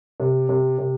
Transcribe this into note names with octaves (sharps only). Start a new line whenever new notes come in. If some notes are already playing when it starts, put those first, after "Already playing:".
C3
C3
C3